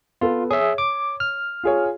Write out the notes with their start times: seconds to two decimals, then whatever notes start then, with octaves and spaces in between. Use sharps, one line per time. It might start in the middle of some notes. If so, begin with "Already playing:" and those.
0.21 B3 F4 A4
0.51 G#4 C#5 E5
0.78 D6
1.20 F6
1.64 F4 G#4 C#5